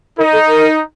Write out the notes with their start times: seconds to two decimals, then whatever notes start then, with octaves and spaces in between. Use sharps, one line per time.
0.18 D#4 A#4
0.32 A4
0.48 A#4